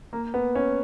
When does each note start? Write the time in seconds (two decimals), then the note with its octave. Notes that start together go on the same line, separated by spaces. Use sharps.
0.13 A#3
0.34 B3
0.55 C#4